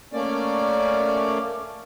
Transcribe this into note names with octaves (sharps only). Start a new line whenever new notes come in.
A3 A#3 C#4 D5